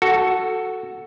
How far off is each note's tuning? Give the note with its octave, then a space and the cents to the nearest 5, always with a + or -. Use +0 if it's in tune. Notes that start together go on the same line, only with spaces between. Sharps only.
F#4 +0 A4 +0